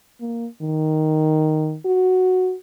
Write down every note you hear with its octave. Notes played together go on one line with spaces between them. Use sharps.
A#3
D#3
F#4